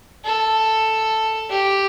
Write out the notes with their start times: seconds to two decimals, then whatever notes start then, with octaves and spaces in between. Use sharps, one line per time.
0.25 A4
1.49 G4